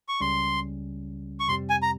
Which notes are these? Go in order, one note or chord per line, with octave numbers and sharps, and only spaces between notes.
C#6
C#2 C#3 G3 C#4 C6
C#6
F2 C3 G3 C4 G4 C6
G#5
A#5